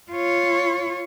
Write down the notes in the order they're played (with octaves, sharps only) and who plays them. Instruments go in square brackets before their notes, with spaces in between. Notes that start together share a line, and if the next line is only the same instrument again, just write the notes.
[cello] F4 C#5